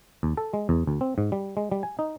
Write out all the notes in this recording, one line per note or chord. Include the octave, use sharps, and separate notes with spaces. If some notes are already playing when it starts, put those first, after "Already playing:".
D#2
A4
G#3
E2
D2
C4
G#2
G3
G#3
G3
G#5
D#4